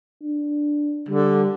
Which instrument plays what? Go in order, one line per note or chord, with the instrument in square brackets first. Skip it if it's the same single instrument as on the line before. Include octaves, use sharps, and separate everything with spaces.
[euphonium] D4
[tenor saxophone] D3 [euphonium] G3